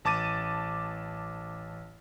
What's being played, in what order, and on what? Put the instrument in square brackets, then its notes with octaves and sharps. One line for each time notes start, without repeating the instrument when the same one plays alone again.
[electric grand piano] A1 A5 D6 A6 D#7